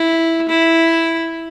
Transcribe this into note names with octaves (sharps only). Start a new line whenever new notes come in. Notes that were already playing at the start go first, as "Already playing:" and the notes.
Already playing: E4
E4